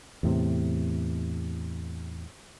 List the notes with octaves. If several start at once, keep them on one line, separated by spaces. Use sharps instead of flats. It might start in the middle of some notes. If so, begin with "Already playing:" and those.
E2 A2 C3